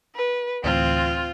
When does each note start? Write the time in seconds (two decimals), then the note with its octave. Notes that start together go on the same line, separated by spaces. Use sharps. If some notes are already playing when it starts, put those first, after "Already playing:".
0.15 B4
0.64 D2 A2 E3 C4 F4